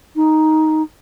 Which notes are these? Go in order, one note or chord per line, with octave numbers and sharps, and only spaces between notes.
D#4